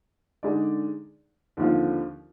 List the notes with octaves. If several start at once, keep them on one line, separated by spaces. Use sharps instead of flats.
D3 G#3 D#4 G#4 D5
D#2 D3 F3 C4 F4